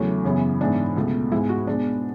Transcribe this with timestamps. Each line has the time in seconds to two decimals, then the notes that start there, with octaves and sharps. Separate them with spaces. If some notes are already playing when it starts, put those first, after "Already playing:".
Already playing: E2 C#3 F#3 A3
0.24 F#2 C#3 E3 B3
0.61 G#2 E3 B3 D4
0.96 C#2 B2 A3
1.32 G#2 G#3 B3 E4
1.49 F#4
1.67 B2 G#3 B3 D4